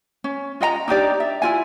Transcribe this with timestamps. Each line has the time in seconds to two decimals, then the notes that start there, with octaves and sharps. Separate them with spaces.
0.24 C#4
0.61 F4 D#5 F#5 A#5
0.88 D4 D#4 G4 D5
1.20 E5
1.42 E4 F4 G#5